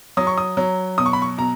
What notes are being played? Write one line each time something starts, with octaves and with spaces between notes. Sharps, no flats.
F#3 D#6
C#6
D#6
F#3
B2 D#6
C#6
B5
C#6
B2 A#5